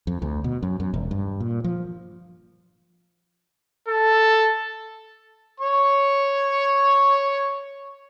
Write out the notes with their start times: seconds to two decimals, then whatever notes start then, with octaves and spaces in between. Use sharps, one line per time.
0.07 F2
0.22 D2
0.44 B2
0.63 F#2
0.80 F#2
0.94 E1
1.11 G2
1.40 A#2
1.64 F3
3.88 A4
5.60 C#5 C#6